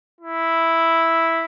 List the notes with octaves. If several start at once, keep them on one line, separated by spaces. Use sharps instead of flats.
E4